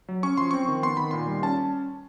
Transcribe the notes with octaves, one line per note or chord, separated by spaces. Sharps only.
F#3
C#4 C#6
F3 C6
C4 C#6
D#3
B3 C6
D#3 B5
A#2 C6
G3
C#4 A5